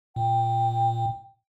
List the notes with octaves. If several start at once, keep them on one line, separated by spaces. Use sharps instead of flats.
A#2 G5